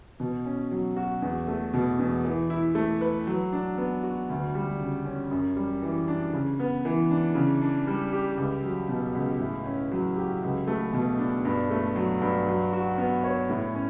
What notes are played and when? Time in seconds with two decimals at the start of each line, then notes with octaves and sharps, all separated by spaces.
0.20 B2
0.45 C#4
0.71 F#3
0.97 F#4
1.22 E2
1.48 A3
1.73 B2
1.99 E2
2.25 E3
2.50 E4
2.75 A3
3.01 B4
3.27 F#3
3.53 D4
3.78 B3
4.03 F#4
4.29 D2
4.55 G3
4.80 C#3
5.05 C#4
5.31 F#2
5.56 G3
5.82 E3
6.08 D4
6.33 C#3
6.59 B3
6.85 E3
7.11 D4
7.35 C#3
7.61 D4
7.87 G3
8.12 G4
8.37 C#2
8.63 F#3
8.89 B2
9.15 C#2
9.40 A2
9.65 C#4
9.91 F#3
10.17 G4
10.43 C#2
10.67 A3
10.93 B2
11.18 D4
11.45 G2
11.70 A3
11.96 F#3
12.21 G2
12.47 F#3
12.73 F#4
12.98 B3
13.24 C#5
13.49 A2
13.75 C#4